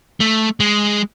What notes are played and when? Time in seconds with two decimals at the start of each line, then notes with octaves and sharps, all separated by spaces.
0.20 A3
0.60 G#3